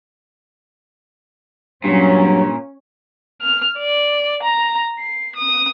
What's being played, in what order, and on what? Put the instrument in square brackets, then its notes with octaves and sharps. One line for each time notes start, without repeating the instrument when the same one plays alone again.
[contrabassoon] G2 [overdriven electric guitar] A#2 [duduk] F#3 [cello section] C#4
[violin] F6
D5
A#5
C7
D#6